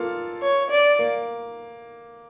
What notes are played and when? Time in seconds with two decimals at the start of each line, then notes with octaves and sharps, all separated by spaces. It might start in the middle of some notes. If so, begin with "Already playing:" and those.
Already playing: A#3 F4 A4
0.42 C#5
0.71 D5
0.99 A#3